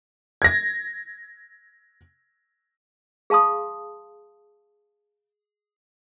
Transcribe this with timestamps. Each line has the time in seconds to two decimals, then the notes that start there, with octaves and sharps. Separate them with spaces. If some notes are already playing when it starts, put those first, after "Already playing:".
0.42 G#6 A#6
3.30 G#4 F5 A5 C6 D#6